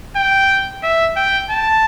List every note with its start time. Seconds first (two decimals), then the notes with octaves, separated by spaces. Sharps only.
0.16 G5
0.83 E5
1.16 G5
1.50 A5